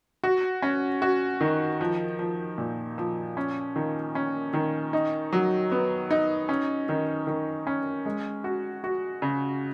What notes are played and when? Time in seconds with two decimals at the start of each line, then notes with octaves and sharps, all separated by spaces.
0.24 F#4
0.62 C#4
1.02 F#4
1.41 D#3
1.81 F3
2.19 F3
2.58 A#2
2.98 F3
3.37 C#4
3.76 D#3
4.15 C#4
4.54 D#3
4.93 D#4
5.33 F#3
5.72 B3
6.11 D#4
6.49 C#4
6.89 D#3
7.27 D#3
7.67 C#4
8.05 G#3
8.44 F#4
8.84 F#4
9.22 C#3